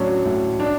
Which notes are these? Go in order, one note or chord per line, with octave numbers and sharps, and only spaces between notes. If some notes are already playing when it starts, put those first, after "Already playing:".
Already playing: A2 F#3 C#4 D4
A2
D4